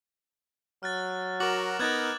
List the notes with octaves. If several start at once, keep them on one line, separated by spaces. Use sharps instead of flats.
F#3 F6 F#6 A6
F#4 A#4 D6 F#7
B3 D#4 A#4 F#6 G#6 A6